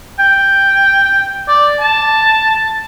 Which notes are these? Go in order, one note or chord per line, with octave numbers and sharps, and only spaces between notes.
G5
D5
A5